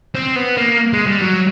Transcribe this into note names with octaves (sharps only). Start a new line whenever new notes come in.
C4
B3
A#3
G#3
G3
F#3